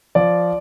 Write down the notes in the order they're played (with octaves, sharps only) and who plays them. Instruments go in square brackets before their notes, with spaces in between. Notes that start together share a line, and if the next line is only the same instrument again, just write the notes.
[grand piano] F3 D5